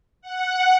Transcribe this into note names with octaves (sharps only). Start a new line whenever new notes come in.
F#5